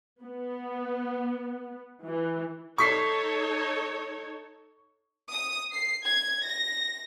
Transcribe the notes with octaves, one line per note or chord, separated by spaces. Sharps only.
B3
E3
D#4 A4 C#5 C#6 B6 C7
D#6
C7
G#6
A#6